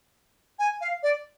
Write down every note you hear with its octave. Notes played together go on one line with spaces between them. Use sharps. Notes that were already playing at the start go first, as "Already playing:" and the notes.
G#5
F5
D5